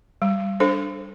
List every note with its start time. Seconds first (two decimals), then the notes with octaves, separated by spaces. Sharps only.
0.22 G3
0.60 D4 A4 C5